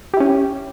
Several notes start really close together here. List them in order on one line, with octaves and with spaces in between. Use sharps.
G4 E4 C#4